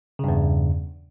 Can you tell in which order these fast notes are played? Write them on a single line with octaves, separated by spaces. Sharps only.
C#3 G2 E2